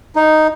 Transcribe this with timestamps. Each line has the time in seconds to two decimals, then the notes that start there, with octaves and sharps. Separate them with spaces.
0.16 D#4